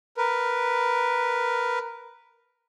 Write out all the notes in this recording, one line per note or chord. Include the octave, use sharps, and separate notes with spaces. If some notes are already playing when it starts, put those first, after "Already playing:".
A#4 B4